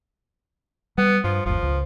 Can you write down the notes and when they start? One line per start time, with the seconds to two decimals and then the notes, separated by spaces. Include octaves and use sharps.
0.98 G3 B3
1.24 G2 F3
1.46 G1 D#2 F3
1.63 C#2